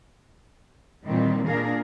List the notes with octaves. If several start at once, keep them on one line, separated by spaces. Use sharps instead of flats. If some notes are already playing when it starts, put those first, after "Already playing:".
A#2 D#3 E3 G3 C4
A#2 D4 G#4 A#4 F5